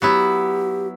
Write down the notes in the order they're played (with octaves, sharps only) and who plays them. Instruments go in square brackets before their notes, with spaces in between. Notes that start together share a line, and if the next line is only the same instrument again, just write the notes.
[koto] F#3 B3 E4 [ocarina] G4